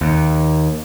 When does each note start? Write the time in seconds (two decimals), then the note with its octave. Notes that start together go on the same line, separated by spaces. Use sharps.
0.01 D#2